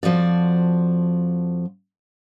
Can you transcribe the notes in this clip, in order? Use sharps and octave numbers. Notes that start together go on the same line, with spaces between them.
F2 F3 F#4 D5